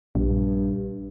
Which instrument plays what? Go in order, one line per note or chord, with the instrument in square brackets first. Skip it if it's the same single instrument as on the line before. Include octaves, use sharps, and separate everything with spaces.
[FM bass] A#1 [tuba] G2